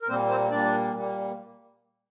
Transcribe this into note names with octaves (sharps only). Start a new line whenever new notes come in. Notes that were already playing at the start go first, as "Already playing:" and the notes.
A#4
A#2 G3 A#3 C4 C5
C4 C5
A#2 G3 A#3 D4 D5
A#2 G3 A#3